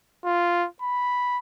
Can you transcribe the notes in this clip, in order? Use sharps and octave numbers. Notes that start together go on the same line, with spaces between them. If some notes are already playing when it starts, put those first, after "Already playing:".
F4
B5